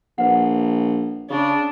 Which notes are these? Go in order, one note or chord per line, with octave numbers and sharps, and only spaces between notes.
A#1 B4 F#5
C#3 D4